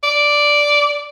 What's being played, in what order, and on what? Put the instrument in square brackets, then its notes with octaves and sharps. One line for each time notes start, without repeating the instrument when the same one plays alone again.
[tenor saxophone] D5